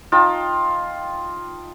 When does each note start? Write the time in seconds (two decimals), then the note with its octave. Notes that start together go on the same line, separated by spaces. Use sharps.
0.12 D#4 F4 G5 A5